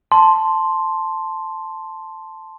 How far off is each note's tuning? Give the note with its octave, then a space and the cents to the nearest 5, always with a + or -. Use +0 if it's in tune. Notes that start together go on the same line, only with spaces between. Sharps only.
A5 +0 C6 +0